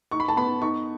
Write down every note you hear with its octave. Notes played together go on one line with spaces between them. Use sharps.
D#4 C#6
B5
A5
B3 B5
D#4 C#6